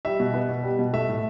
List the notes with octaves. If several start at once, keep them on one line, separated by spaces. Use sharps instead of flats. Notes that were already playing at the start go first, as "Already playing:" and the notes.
G3 E5
B2
B3
B2
G3
B2
A3 E5
A2